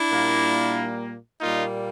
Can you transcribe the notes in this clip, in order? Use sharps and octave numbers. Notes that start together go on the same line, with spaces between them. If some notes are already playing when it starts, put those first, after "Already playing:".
Already playing: D4 E4
A#2 G3 A#3
A#2 G3 A#3 D#4 F4